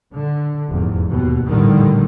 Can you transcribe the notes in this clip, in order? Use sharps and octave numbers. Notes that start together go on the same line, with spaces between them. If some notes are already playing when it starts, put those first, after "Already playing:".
D3
F1 E2 G#2
D#2 B2
A#1 A2 D3 D#3 G3